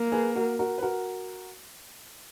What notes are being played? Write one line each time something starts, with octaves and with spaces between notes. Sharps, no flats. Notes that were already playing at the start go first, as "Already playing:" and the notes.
Already playing: A#3
G#4 B4
F#4 A#4
F#4 A#4
B4
F#4 A#4